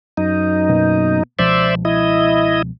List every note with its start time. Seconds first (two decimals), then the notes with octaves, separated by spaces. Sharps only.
0.17 F#2 D#4
0.69 B2 A#3 B3
1.39 C#2 B2 F3 C5 D5 E5
1.85 E4 D#5